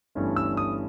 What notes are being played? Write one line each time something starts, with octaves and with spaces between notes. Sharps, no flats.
G1 G2 E3 A3 C#4
E6
D#6